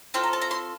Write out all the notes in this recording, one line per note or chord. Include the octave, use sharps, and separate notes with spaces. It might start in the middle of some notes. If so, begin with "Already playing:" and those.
C4 F4 A4 G5
A#5
A5
A#5
C6